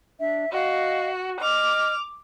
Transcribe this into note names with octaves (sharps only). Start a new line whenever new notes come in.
D4 E5
F#4 D#5 F5
D#5 D6 F6 F7